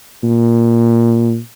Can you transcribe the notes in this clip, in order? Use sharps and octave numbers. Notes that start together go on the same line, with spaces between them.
A#2